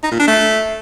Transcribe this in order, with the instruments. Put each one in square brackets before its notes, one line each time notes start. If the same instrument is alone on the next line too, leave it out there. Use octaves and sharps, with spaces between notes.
[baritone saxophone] D#4
A#2
D4
A3